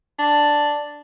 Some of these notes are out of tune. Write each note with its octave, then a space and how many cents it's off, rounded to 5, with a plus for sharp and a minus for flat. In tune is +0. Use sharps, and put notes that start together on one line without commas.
D4 +0